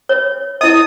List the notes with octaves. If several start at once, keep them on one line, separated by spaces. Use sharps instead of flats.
C#5
E4 D#5 D#6